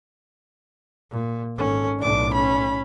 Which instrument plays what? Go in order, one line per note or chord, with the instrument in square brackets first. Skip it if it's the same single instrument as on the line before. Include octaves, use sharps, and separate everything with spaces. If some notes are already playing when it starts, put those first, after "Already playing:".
[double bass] A#2
[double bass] G#1 C#4 [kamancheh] A4
[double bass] B1 A2 [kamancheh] D4 D6
[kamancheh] C#4 B5